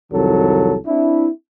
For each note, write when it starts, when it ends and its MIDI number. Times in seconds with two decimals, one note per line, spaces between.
0.13 0.77 36
0.13 0.77 41
0.13 0.77 51
0.13 0.77 54
0.13 0.77 69
0.86 1.29 60
0.86 1.29 62
0.86 1.29 64